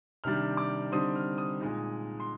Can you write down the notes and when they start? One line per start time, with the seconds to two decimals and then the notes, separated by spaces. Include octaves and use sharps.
0.24 C3 D#3 G3 D4 F6
0.57 D6
0.92 D3 G3 C4 D#4 D#6
1.16 F6
1.38 D#6
1.60 A#2 G#3 D#4
2.20 C6